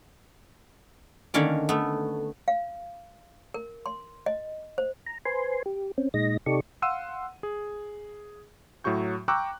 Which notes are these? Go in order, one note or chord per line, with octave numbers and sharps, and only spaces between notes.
D3 D#3 A#3 C#4 C#5 D5
A3 B3
F5
A#4
C6
D#5
C5
A#5
B4 C5 G#5 C6
G4
C4 C#4
A#2 G#3 D#4 D#5 A#6
C3 D#4 G4 A4 D5 C#6
F5 F#5 C6 E6 D#7
G#4
A2 F#3 F#4 C#6 G6
G5 A#5 C#6 D6 E6 F#6